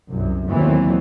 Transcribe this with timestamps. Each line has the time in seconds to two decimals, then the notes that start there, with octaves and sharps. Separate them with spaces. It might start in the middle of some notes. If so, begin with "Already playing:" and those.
0.11 C2 F#2
0.48 D#2 D3 E3 F#3 B3 C4